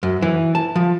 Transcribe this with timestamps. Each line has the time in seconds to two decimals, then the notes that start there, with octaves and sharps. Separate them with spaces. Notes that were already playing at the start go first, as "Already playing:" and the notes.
0.03 F#2
0.22 E3
0.55 A5
0.76 F3